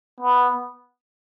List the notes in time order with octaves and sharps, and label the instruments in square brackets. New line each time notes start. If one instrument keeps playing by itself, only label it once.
[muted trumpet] B3